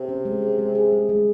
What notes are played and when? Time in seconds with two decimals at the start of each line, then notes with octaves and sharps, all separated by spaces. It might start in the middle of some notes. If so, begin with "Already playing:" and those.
Already playing: C3
0.09 C#4
0.25 G#3
0.42 G#4
0.59 G#3
0.75 G#4
0.92 G#3
1.09 G#3